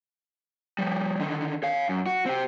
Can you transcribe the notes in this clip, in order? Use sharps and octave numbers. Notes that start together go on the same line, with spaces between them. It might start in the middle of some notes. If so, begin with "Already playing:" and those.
F3 G3
D3 D#3
C#5 F5
F#2
F#4
C4 G4